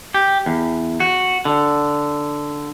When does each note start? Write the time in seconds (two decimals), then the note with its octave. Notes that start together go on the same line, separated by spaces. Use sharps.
0.14 G4
0.46 E2
1.00 F#4
1.45 D3